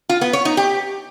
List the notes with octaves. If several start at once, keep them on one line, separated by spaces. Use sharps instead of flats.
F4
B3
C#5
D#4
G4